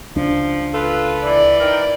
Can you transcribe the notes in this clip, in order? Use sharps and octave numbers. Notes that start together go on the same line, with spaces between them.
C#2 F3 D4
F4 A4 B4
E3 D5
D#4 A#4 G5